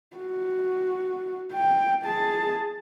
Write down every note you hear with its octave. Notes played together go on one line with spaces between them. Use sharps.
F#4
G5
G#4 A5